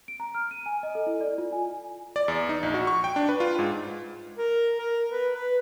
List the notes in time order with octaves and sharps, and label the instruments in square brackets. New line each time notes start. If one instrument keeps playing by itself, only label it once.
[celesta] D7
A#5
F6
D#7
G#5
D#5
A4
E4
D5
F4
G#5
[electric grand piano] D5
E2
D#4
A#1
F#4
C#6
G5
D4
B4
F4
G#2
[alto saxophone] A#4
A#4
B4
B4